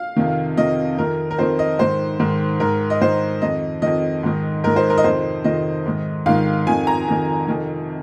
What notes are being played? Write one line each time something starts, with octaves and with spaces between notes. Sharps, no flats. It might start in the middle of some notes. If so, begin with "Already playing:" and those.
Already playing: F5
F2 C3 D#3
F2 C3 D#3 D#5
F2 D#3 A#4
A#4
F2 D#3 C5
D#5
G#2 D#3 C5
G#2 D#3
G#2 D#3 A#4
D#5
G#2 D#3 C5
F2 D#3 D#5
F2 D#3 D#5
G#2 D#3
G#2 D#3 A#4
C5
A#4
D#5
F2 C3 D#3 C5
F2 C3 D#3 D#5
G#2 D#3
G#2 D#3 F5
F2 D#3 G#5
A#5
F2 D#3
F2 C3 D#3